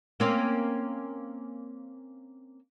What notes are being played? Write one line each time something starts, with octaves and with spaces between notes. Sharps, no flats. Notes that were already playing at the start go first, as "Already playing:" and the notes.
A#3 C4 C#4